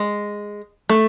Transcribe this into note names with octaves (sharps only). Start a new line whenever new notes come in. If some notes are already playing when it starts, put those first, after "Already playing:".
Already playing: G#3
A3